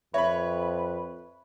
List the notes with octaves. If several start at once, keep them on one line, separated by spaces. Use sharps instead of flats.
F2 B4 C#5 E5 B5